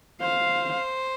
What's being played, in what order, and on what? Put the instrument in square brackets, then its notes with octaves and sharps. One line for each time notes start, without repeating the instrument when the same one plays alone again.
[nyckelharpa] C5 [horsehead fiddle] F5